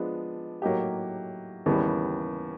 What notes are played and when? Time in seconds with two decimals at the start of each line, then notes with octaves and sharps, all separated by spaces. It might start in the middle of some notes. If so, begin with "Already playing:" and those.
Already playing: F3 G#3 B3 D4
0.62 A2 F#3 A#3 D#4 G4
1.66 D#2 C#3 E3 G3 B3